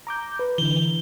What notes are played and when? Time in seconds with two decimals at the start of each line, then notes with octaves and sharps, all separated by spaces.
0.07 A#5 D6 G6
0.39 B4
0.58 D3 E3 G7